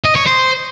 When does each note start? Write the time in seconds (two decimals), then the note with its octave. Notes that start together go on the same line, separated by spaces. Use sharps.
0.05 D#5
0.16 C#5
0.27 C5